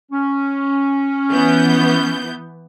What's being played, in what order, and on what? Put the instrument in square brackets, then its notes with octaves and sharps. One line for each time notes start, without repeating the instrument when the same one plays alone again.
[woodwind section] C#4
[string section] E3 B3 G6